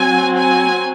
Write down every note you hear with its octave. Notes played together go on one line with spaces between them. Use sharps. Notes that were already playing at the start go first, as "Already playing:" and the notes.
Already playing: F#3 C4 G#5
G#5